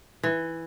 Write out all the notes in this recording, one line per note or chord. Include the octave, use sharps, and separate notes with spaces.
E3